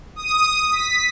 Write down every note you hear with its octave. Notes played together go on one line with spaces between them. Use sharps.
D#6
B6